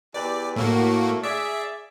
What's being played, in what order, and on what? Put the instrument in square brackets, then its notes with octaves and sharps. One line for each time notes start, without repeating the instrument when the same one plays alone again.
[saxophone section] E2 G4 B4 [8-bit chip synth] D5
[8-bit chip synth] A2 A#3 F#4 [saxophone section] A3
[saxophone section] G#4 D5 [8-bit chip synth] E5